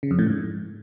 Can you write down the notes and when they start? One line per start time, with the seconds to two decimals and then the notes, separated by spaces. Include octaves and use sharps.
0.03 C#3
0.11 F2
0.19 A2
0.27 G#2